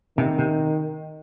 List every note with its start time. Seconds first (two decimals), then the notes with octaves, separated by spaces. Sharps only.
0.18 C3 D#3
0.38 C3